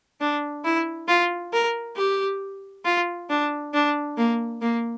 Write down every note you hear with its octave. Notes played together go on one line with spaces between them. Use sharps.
D4
E4
F4
A#4
G4
F4
D4
D4
A#3
A#3